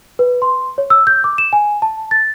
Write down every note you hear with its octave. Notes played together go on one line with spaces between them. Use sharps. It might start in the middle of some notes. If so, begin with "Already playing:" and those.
B4
C6
C#5
E6
G6
D6
E7
G#5
A5
A6